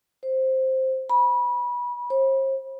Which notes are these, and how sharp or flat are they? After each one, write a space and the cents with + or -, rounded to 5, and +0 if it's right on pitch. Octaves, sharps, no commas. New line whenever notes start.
C5 +5
B5 -25
C5 +40